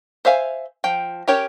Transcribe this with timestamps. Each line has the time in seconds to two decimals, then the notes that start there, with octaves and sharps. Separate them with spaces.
0.25 C5 E5 F5 G#5
0.84 F3 G5
1.28 C#4 G4 A#4 C#5 G5